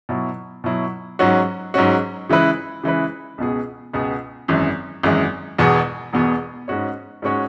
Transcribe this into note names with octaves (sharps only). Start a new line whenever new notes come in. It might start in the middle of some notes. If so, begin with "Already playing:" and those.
B2 F#3 E4
B2 F#3 E4
G#2 F#3 C#4 F#4
G#2 F#3 C#4 F#4
C#3 E3 G#3 E4 B4
C#3 E3 G#3 E4 B4
C#2 B2 B3 G#4
C#2 B2 B3 G#4
G#1 F#2 E3 G#3
G#1 F#2 E3 G#3
E1 E2 B2 B3 G#4
E1 E2 B2 B3 G#4
G#2 G#3 C#4 F#4 C#5
G#2 G#3 C#4 F#4 C#5